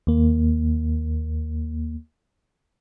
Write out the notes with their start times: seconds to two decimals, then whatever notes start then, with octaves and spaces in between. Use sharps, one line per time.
0.07 D#2 A#3